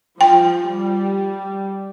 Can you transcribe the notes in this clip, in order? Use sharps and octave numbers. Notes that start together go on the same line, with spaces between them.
F3 G5
G3